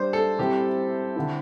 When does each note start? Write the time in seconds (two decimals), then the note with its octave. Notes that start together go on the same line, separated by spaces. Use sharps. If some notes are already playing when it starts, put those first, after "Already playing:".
Already playing: G3 D4 G4 C5 D5
0.13 A4
0.39 C3 G3 C4 E4 G4
1.16 D3 C4 E4